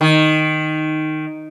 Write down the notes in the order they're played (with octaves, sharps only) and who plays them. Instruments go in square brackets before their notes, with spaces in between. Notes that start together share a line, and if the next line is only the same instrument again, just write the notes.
[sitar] D#3